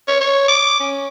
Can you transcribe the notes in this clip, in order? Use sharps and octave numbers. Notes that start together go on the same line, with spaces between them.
C#5
C#5
D6
C#4